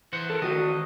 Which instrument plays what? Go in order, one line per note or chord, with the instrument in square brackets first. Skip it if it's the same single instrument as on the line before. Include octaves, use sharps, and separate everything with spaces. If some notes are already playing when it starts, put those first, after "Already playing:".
[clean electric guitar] E3 C5 F#5
[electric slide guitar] A4 A#4
[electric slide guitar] D#3 F#4 [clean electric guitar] D#5